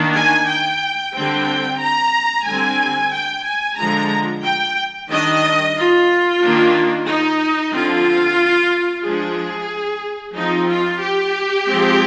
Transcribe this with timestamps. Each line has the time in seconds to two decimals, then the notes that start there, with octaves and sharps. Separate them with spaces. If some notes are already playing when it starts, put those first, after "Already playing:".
Already playing: D#3 A#3 D4
0.16 G#5
0.48 G5
1.15 D3 G3 C4 G5
1.80 A#5
2.46 D3 G3 C4 G#5
3.12 G5
3.45 G#5
3.78 D3 F3 G#3 A#5
4.43 G5
5.09 D#3 G3 D4 D#5
5.76 F4
6.41 D#3 A#3 D4
7.07 D#4
7.73 D3 F3 C4 F4
9.04 F3 G#3 D4 G#4
10.36 F3 C4 D#4
10.69 F4
11.02 G4
11.68 F3 G#3 C4